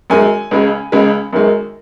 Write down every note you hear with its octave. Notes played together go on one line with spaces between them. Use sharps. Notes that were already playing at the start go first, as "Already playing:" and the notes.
F#2 D#3 G#3 G#5
C#2 C#3 G#3
C#2 C#3 G#3
F#2 D#3 G#3